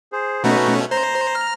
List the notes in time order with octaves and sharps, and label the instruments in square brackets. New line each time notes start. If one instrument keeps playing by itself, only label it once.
[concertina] G#4 C5
[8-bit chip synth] B2 A3 C#4 [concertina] D#4 F#4 B4
[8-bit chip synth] C5 [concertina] A#5
[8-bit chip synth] F6